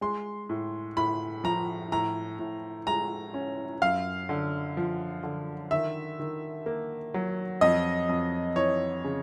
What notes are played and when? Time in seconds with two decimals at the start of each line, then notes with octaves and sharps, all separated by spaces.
0.01 G#3 C6
0.49 A2
0.97 A2 B5
1.44 F3 A#5
1.92 A2 A#5
2.39 A2
2.86 G#3 A#5
3.34 C#4
3.82 F#2 F5
4.29 D3
4.77 F3
5.23 D3
5.71 D#3 E5
6.20 D#3
6.66 A#3
7.14 F#3
7.61 F2 D#5
8.09 F2
8.56 E3 C#5
9.04 C#3